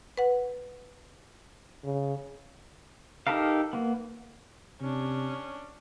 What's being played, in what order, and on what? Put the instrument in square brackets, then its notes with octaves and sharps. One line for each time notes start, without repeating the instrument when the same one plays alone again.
[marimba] B4 F#5
[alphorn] C#3
[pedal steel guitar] D#4 G4 A4 A#4 F5
A#3 B3
[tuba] C3 [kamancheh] C#4 D4